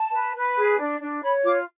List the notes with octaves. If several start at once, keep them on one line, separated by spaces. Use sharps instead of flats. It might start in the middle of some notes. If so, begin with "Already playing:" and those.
Already playing: A5
B4
B4
G#4
D4
D4
C#5 B5
F4 D6